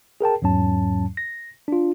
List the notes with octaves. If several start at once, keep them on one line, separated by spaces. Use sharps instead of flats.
G#4 A#4 G5 A5
E2 G#2 F#3 C#4 A5
A#6
D4 F4